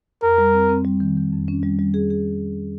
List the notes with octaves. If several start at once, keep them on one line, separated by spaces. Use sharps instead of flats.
F2 A#4
G3
C4
C4
G3
D#3
D#3
F2
C#4
G3
G3
G#4
G#4